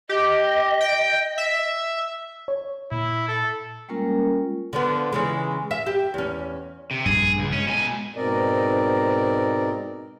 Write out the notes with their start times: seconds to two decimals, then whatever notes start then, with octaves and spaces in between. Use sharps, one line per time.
0.09 G4 D#5
0.81 G5
1.38 E5
2.48 C#5
2.92 A#2 E4
3.28 A4
3.89 G3 G#3 A#3 C#4 F4 A#4
4.73 D3 F3 B3
5.12 C#3 E3 G#3
5.71 E5
5.86 G4
6.14 E2 C#4
6.91 C3
7.06 A#1 G2 G#4
7.39 C#2
7.52 G#3 C#4
7.67 B2 G#5
8.16 G#2 B2 C4 A#4 D5 D#5